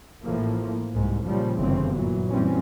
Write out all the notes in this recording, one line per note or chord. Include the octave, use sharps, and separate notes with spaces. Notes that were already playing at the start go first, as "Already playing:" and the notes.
A1 A2 F3 A#3
C2 G#2
A#2 C#3 F3 G3
G1 F#2 C#3 E3 C4
A#2 E3 F#3
F#2 E3 G3 C4 C#4